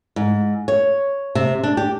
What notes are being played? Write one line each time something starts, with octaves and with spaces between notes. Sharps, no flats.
G#2
C#5
C3
D4
G4